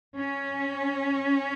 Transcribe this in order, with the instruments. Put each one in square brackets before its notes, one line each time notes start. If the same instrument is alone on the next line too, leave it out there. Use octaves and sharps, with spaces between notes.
[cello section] C#4